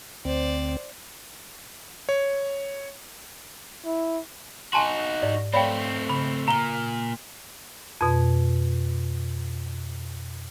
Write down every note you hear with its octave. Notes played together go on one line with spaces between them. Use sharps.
D2 C4 C5 D5
C#5
E4
D#4 F#4 G#5 A5 C6 E7
G#2 D5
A3 C4 C#5 D5 F5 G5 B5
C#3 B5
A#2 A#5 G7
F2 B2